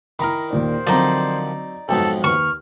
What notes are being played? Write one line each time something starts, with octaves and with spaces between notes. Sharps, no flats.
D#3 E4 A#4 A#5 B5
D#2 A#2 C5 D5
D3 D#3 F3 F#3 C4 D#4 D5
B1 F2 G#2 B2 A4 G5
D#2 B4 C#6 F6